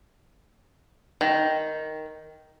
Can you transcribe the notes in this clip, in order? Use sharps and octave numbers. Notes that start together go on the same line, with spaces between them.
D#3